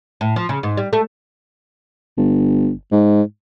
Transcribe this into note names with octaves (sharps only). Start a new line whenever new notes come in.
A2
F3
C#3
G#2
G3
A3
G1
G#2